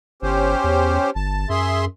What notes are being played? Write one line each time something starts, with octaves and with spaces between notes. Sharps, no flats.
G1 C#4 G4 C5
E2
G1 A5
F#2 G#4 E5 C6